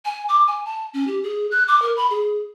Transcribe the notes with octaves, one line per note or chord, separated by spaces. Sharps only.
G#5
D6
G#5
A5
C#4
G4
G#4
F#6
D6
A#4
B5
G#4